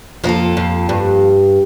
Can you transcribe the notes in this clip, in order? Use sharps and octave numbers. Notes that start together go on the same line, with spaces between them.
F2 F3 A#3 F4 A4
F2
G2